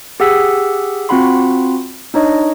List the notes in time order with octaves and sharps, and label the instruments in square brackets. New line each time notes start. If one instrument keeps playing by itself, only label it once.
[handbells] G4 G#4 F#5 E6 B6
C4 F4 F#4 F#5 B5 C6
D4 D#4 C#5 D#5